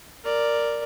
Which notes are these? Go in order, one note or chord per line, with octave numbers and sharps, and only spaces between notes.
A#4 D5